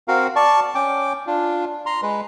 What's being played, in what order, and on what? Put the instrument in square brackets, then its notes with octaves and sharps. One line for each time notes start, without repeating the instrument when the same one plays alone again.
[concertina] C4 F#4 A#4 F5
D5 A5 C#6
C#4 G5 D6
D4 F4
A#5 C6
G#3 B4